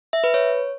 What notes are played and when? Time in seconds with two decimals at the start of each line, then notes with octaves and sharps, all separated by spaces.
0.13 E5
0.24 B4
0.34 C#5